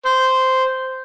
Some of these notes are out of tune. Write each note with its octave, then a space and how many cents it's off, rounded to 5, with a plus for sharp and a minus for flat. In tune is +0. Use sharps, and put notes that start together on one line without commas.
C5 -10